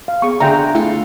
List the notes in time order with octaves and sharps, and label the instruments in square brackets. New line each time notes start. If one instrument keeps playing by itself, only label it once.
[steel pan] F5
[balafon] B3 G#4 [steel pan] C#6
[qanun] D3 [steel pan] G#4 G5 A#5 [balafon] E5 F5 C6
[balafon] A3 [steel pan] E4 [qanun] F4 A4 F5